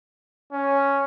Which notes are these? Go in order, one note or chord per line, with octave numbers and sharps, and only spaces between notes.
C#4